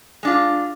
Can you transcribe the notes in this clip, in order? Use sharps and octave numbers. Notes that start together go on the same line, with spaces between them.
G#3 D4 F4